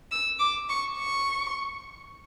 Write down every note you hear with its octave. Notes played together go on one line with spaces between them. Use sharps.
E6
D6
C#6
C#6